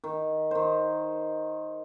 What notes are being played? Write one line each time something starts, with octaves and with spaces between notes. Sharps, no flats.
D#3
D#3 C5